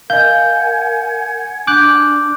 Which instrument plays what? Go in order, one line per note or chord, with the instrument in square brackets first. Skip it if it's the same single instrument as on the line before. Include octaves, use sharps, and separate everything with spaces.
[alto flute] A#4 [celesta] D#5 F5 [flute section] F#5 G#5 G#6 [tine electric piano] G6
[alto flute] D4 [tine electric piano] D6 F#6 [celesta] G6